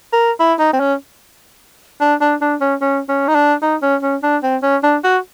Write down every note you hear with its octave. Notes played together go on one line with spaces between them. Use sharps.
A#4
E4
D#4
C4
C#4
D4
D4
D4
C#4
C#4
C#4
D#4
D4
D#4
C#4
C#4
D4
C4
C#4
D4
F#4